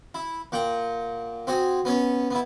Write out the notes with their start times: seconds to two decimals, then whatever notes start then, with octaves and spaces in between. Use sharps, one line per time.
0.15 E4
0.52 A#2 F#5 G5
1.47 C4 F#4 G#4
1.85 B3 C#4 C#5
2.30 B3 E4